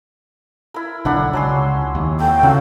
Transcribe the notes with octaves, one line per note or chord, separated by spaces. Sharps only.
E4 A#4
B1 D3 D4 F#5 B5
C#2 F#3 C#4 C6
D#2
A3 G5
C#3 F#3 C#4 F4